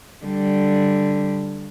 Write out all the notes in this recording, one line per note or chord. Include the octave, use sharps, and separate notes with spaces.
D3 G3